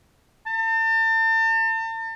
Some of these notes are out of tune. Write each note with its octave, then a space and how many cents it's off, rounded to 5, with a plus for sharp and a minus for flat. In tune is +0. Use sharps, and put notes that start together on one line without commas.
A5 +40